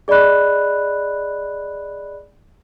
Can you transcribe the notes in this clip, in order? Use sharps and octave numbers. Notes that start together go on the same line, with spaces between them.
G#4 D5 D#5 B5 F#6